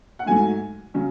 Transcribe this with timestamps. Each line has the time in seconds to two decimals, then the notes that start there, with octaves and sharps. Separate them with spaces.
0.19 F#5
0.26 G#2 F#3 A3 G#5
0.94 C#3 F#3 C#4